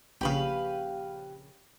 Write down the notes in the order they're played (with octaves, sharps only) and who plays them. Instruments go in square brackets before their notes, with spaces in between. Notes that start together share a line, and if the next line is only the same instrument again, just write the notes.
[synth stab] A#1 C#3 [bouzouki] G4 B4 F5